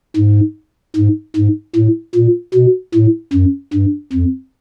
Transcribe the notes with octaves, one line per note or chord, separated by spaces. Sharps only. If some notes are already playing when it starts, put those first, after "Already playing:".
G#2
G#2
G#2
A2
A#2
B2
A2
F#2
G2
F2